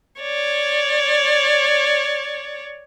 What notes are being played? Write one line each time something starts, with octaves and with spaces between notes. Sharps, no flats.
C#5 D5